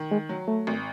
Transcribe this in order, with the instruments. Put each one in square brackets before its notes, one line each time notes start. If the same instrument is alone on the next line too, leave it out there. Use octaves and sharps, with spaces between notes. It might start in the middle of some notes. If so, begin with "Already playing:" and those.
Already playing: [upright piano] D#3
[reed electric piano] G#3
[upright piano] F#3
[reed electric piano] A3
[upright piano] G#1